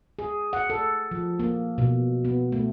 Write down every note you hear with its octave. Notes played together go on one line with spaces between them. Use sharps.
G#4
F#5
A4
F3
A#3
B2
B3
A3